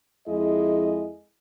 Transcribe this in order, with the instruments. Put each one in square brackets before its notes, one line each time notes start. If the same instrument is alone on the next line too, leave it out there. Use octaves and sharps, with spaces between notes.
[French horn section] F2 G#3 E4 G#4 D#5